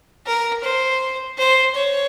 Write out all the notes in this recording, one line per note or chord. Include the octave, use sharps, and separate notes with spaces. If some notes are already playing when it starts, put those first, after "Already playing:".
A#4
C5
C5
C#5